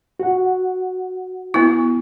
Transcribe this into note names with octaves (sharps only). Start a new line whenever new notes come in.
F#4 F#5
B3 E4